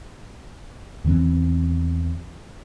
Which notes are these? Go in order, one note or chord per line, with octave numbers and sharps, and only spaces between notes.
E2 D#3 E3 C4